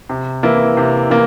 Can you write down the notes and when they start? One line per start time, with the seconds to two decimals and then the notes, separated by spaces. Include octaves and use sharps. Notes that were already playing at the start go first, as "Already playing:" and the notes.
0.09 C3
0.43 E3 A#3 E4
0.77 C3
1.10 E3 A#3